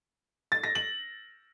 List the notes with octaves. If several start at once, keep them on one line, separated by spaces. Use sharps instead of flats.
A6
A#6
F#7